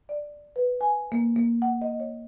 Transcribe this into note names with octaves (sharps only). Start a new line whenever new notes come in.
D5
B4
G#5
A#3
A#3
F#5
D#5
C#5